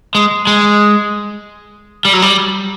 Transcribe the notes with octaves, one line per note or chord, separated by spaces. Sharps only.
G#3
G#3
G3
F#3
G3